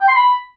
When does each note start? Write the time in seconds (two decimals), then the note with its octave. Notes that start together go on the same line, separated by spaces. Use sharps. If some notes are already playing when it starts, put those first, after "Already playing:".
0.01 G5
0.08 C6
0.15 B5